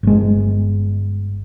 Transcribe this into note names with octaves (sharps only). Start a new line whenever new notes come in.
G1 G#3